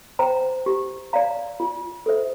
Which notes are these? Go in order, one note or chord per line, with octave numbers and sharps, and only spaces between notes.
C5 G5 A#5
G4
D5 F5 A#5
F4
A4 C5 E5